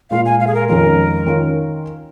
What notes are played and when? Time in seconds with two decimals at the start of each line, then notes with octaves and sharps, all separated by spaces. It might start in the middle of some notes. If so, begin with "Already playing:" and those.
0.11 A#2 G#3 F4 F5
0.25 G#5
0.40 F5
0.47 G#4
0.54 A#4
0.69 F2 D#3 G#3 C#4 F4 A#4
1.26 D#3 C#4 F4